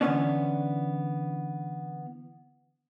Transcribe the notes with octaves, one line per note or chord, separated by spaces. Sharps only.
D3 E3 F3 B3 C#4 D4